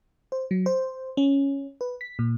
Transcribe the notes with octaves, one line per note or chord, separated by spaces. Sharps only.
C5
F#3
C5
C#4
B4
B6
A#2